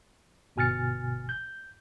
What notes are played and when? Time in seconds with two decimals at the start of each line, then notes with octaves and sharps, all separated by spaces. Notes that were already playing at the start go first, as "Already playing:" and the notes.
0.56 G1 B2 G#5 F6 A6 C#7
1.29 G6